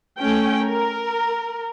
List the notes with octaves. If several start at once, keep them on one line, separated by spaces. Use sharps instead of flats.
A3 C#4 G5
A#4